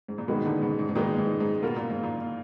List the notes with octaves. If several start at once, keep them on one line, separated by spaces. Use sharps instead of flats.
G#2
A#2
G#2 B2 D#3 G#3 B3 D#4
A#2 D3
G#2 B2
G#2
G#2
A#2 D#3 G#3 B3 D#4
G#2
G#2
B2 A#3 F4 A#4
A#2
G#2
A#2